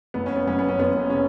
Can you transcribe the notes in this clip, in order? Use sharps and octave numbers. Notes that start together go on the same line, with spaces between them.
F#1 B3
C#4
B3
F#2 C#4
B3
C#4
F#1 B3
C#3 C#4